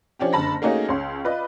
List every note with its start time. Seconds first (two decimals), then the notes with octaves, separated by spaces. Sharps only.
0.19 F3 C#4 D4 G4
0.33 F#1 D3 A5 B5 A#6
0.62 A3 A#3 C#4 D#4 F#4 G#4
0.89 C#2 C#5 C6
1.24 F4 B4 D5 D#5